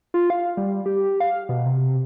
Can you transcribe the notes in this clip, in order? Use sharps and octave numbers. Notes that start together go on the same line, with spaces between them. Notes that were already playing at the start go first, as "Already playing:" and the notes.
F4
F5
G3
G4
F5
B2
C3